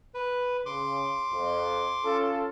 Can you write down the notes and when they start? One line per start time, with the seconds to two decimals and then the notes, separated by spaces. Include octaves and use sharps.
0.14 B4
0.66 C#3 C6 D6
1.32 F2
2.04 C#4 F4 A4